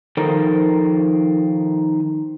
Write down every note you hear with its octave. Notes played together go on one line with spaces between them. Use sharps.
D#3 F3 D#4 A4 A#4 C5